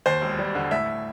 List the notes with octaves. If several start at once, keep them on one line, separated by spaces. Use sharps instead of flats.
D#2 C5
E1
G3
D3
A2 E5